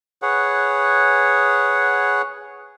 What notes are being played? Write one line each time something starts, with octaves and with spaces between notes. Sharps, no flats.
G#4 B4 C#5 F#5